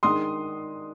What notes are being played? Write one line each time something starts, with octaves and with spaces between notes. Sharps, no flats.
D#3 G#3 D4 C6 D#6